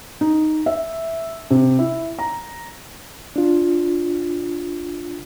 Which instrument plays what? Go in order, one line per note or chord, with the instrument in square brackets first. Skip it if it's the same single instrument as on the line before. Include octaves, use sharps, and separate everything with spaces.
[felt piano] D#4
E5
C3
E4
A#5
[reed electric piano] D4 F4